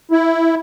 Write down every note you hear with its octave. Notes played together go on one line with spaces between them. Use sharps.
E4